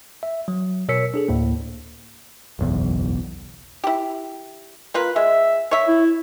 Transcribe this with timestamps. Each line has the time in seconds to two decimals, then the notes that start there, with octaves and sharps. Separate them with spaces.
0.23 E5
0.48 F#3
0.89 B2 A#4 C#5 E6 B6 C#7
1.14 D4 G#4 A4
1.28 D2 A2 A#3
2.59 F#1 B1 E2
3.84 E4 G4
4.94 A#3 F4 B4
5.16 G#3 E5
5.71 C#5 E5
5.88 E4